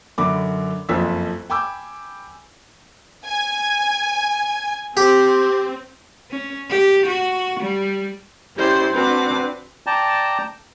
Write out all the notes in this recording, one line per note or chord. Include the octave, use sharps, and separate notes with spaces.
F#2 D3 B5 D6
F#1 F2 F3 A4 E6 B6
G5 G#5 B5 D6 E6 G6
G#5
C4 G4
C#4
G4
F#4
G3
C#4 E4 G4 C5 D5
C4 D4 F#4 B4 D6
D5 G5 A5 A#5